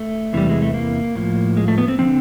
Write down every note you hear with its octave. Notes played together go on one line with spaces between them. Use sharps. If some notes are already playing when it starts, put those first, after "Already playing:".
Already playing: A3
E2 C3 E3 G3
G#3
A3
A#3
A2 F3
G#3
A3
B3
C4
D3 F3 C4